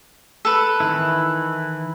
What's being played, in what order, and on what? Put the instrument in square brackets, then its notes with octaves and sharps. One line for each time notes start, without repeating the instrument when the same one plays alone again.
[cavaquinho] A4 B4
[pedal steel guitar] D#3 E3 E4